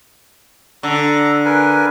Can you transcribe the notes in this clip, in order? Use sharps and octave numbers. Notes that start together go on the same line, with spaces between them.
D3 A4 A#5
A#4 B4 G#5